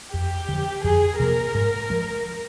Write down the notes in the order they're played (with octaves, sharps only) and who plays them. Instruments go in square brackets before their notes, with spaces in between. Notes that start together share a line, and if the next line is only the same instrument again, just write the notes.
[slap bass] F2 [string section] G4
[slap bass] D3 F3
[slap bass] F2 [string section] G#4
[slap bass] C3 F3 A#3 [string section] A#4
[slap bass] G#2
F3 G#3